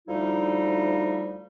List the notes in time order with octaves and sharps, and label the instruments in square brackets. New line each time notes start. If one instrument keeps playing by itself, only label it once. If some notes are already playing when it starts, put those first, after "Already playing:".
[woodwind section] D2 F3 G3 A3 D#4 E4